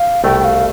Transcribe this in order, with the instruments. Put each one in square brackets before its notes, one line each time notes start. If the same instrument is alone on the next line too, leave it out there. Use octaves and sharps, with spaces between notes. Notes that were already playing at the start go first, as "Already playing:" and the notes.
Already playing: [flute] F5
[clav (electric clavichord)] C2 B2 A3 [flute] G5
[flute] G5
F5